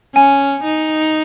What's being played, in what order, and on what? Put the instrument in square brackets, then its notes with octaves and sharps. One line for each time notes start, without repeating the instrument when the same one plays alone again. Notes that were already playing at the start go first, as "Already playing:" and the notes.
[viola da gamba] C#4 [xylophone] G#5
[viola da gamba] D#4